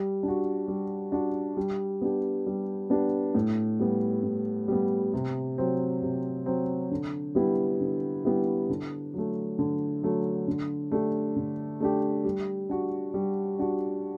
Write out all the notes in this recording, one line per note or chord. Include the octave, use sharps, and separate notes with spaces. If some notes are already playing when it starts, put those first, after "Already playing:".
Already playing: G3
D4
F#4
G3
D4 F#4
G3
B3 D4 G4
G3
B3 D4 G4
A2
G3 B3
A2
G3 B3
C3
F#3 C4
C3
F#3 C4
D3
G3 B3 E4 G4
D3
G3 B3 E4 G4
D3
F#3 A3
D3
F#3 A3
D3
A3 D4 G4
D3
A3 D4 G4
G3
D4 F#4
G3
D4 F#4